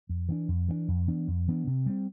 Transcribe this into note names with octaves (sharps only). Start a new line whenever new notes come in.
F2
E3 B3 D4
F2
E3 B3 D4
F2
E3 B3 D4
F2
E3 B3 D4
C3
G3 C4